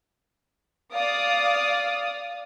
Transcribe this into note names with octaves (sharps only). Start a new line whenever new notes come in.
D5 F5 D#6